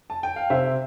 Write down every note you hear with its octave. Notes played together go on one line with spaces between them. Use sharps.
A5
G5
F5
C3 C5 E5